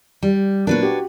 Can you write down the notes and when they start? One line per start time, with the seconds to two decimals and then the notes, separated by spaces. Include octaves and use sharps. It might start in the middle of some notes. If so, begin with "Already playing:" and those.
0.23 G3
0.67 A#2 F#3 D4 A#4 B4 C#5
0.82 F#4 G4